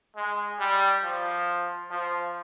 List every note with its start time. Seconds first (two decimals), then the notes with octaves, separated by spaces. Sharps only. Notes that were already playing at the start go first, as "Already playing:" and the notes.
0.16 G#3
0.60 G3
1.03 F3
1.91 F3